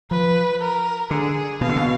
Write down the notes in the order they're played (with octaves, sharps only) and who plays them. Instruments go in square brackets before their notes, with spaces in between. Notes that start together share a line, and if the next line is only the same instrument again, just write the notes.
[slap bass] F3 [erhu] B4
[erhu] A#4
[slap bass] D3 [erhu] G#4
[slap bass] B2 [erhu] F5
[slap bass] D3
B2